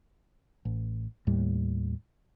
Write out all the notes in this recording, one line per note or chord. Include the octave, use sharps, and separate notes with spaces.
A1
D#2 A2 G3